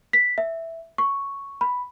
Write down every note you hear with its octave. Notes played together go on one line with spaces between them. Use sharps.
B6
E5
C#6
B5